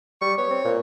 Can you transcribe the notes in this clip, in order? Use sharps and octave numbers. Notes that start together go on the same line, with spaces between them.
G3 C#6
B3 C#5
C4
A#2